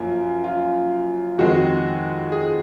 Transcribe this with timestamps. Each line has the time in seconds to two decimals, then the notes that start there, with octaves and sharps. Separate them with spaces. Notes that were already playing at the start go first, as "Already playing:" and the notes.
Already playing: F#2 F3 A#3
0.44 F4
1.38 F2 D#3 G#3 C4 F#4
2.32 G#4